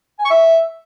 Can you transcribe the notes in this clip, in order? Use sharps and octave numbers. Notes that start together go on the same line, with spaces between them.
G#5
C#6
E5